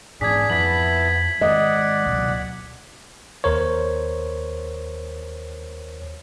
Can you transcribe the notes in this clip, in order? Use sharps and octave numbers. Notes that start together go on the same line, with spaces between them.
G#2 E3 B3 D4 G#4 G#6 B6
F2 F3 B3 E4 A5 B6 F#7
D#3 G#3 D5 D#5 F#5
C#2 B2 F#3
D#2 A#4 C5 C#5